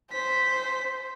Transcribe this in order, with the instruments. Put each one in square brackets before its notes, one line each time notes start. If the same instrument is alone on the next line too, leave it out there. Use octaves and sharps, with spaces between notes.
[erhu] C5 [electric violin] B6